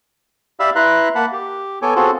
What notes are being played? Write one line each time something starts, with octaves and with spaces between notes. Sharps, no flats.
G4 D5 E5 F5 B5 E6
E4 B4 E5 A#5 C6 F#6
A#3 F#5 A5 B5
G4
B3 A4 C#5 G#5 D6
C4 F4 F#4 G#4 A4